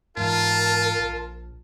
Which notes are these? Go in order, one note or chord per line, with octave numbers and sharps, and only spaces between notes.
G#2 E3 F4 A#4 A5
A#1